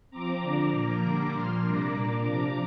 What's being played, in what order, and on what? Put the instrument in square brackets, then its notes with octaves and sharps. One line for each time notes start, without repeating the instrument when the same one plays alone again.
[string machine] F3 C4 A#5 D6
D3 F3 D4
A#2 F3 A#3
D3 G3 A#3 D4 A#5 D6
A#2 F3 A#3 C6 F6
C3 G3 A#3 D4 A#5 D6
A#2 A#3 D4
C3 F3 D4